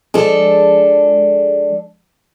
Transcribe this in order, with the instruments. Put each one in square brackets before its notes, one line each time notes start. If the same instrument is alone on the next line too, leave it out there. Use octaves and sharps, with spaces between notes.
[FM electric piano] F3 G#3 G#4 [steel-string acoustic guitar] D4 A4